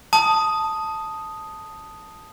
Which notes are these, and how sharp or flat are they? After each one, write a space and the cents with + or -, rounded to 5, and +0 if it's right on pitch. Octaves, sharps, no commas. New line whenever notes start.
A5 +0 D#6 +0